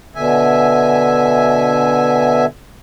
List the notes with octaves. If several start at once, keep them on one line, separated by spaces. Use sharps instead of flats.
B2 D3 E5 G#5